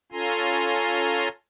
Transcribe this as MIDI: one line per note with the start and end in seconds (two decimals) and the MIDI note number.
0.12 1.28 61
0.12 1.28 65
0.12 1.28 69
0.12 1.28 80
0.12 1.28 82
0.12 1.28 84